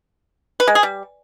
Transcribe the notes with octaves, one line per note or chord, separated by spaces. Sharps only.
B4
G#3
G#4
G3